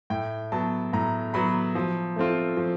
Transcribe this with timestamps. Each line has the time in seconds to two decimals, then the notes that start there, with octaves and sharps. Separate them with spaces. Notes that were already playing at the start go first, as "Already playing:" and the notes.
0.10 A2 G5
0.52 F#3 B3 A5
0.93 A2 A#5
1.34 F#3 B3 B5
1.75 F3
2.16 A3 C4 F4
2.57 F3